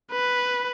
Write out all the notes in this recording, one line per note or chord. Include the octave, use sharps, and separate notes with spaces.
B4